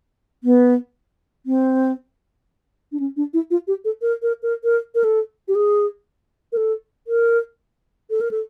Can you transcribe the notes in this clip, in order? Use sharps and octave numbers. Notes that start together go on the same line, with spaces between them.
B3
C4
D4
C#4
D4
E4
F4
G4
A4
A#4
A#4
A#4
A#4
A#4
A4
G4
G#4
A#4
A4
A#4
A4
A#4
A4